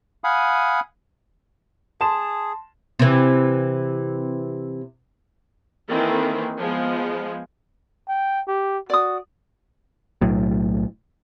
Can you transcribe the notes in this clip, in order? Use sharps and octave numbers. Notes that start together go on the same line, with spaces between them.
F5 F#5 G#5 B5 D#6
G#4 A5 C6 E7
C3 E3
D#3 E3 A#3 C4 A4
F3 G#3 B3
G5
G4
F#4 D5 D#6
B1 A2 F#3